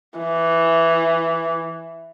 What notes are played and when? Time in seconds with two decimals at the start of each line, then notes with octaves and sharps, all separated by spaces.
0.19 E3